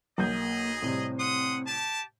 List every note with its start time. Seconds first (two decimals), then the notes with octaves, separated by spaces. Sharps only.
0.18 B1 A#3 G#4 D#5 G6
0.82 A2 C3 G3 C4
1.19 F#5 C6 D#6
1.66 G4 A5